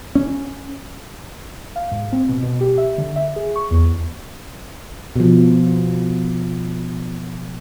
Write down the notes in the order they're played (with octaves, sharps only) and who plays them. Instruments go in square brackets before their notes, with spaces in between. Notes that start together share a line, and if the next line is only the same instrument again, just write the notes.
[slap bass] C#4
[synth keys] F5
G#2
C4
B2
B2
G4
E5
D3
E5
G#4
C#6
E2
[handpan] B2 F3